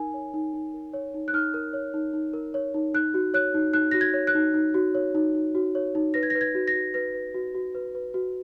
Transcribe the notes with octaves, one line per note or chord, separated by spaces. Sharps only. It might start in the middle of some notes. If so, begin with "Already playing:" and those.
Already playing: D#4 A#4 G#5
C#5
D#4
D#4
A#4
C#5
D#4
F#6
D#4 F6
A#4
C#5
D#4
D#4
A#4
C#5
D#4
D#4 F#6
F#4
C#5 F#6
D#4
D#4 F#6
F#4 A#6
G#6
C#5
F#6
D#4
D#4
F#4
C#5
D#4
D#4
F#4
C#5
D#4
B4 A#6
G#6
B4 A#6
G#6
F#4
A#6
F#4
B4 A#6
B4
F#4
F#4
B4
B4
F#4